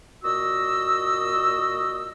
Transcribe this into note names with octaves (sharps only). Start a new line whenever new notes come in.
A#2 F#4 D#5 E6